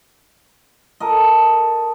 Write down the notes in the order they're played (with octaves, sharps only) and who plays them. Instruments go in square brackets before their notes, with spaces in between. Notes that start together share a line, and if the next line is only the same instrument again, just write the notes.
[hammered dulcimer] A4 A#4 D#5